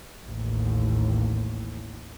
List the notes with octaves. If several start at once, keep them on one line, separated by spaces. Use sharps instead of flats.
A1 D#2